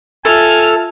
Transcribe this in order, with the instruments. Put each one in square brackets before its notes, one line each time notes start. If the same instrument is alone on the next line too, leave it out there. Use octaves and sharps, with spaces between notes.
[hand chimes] F4 E5 A6 [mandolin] A4 [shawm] G#5 [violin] F6 F7